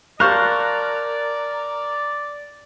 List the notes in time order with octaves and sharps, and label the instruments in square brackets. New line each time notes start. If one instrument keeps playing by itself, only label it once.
[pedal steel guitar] A#4 [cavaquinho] C5 F5 A5 [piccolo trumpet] D5 [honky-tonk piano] C#6 F6 F#6